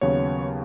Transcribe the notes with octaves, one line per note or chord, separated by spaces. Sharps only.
D#2 C#3 F#3 B3 C#5